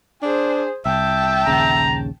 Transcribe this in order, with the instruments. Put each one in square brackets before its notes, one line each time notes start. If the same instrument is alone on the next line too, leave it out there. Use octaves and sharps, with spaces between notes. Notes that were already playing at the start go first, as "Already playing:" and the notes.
[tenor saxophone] D4 [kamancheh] G#4 C5
[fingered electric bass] C2 [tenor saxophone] E5 [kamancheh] G5 A5
[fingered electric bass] A#1 D#2 C#3 [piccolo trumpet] A#5